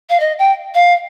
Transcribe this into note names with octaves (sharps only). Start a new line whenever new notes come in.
F5
D#5
G5
F5